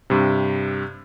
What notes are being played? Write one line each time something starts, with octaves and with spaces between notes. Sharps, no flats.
G2 C3